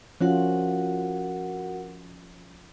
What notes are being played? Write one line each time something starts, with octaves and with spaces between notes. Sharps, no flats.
F3 C#4 F4 F#4 A#4 F#5